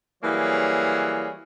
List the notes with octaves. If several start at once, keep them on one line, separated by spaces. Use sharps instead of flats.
E3 F#3 G3 A#3 G#4 C#5